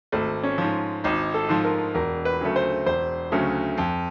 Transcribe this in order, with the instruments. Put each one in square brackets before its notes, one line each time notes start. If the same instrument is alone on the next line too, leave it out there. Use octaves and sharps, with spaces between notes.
[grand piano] G#1 [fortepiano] A3
[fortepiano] C#4
[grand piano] G#2 F3
[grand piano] G#1 [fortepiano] D#4
[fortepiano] A4
[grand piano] G#2 F3
[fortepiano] A#4
[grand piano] E1 [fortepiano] A#4
[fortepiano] B4
[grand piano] D2 C#3 F#3 A3
[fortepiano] C5
[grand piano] E1 [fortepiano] C5
[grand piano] D2 C#3 F#3 A3
F2